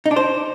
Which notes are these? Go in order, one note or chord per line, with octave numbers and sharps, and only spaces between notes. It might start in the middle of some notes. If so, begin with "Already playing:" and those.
D#4
D4
C5